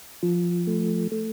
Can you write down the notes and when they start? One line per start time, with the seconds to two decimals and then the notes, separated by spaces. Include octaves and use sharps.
0.23 F3
0.67 A3
1.12 A3